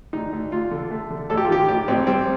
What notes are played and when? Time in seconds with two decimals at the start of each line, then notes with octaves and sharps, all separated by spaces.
0.13 D2 D#4
0.33 D2
0.52 D2 F4
0.71 D3
0.91 A3
1.10 D3
1.30 A1 A4
1.37 G4
1.44 F4
1.49 D#3 G4
1.68 A1 G4
1.88 A1 C4
2.07 G3 C4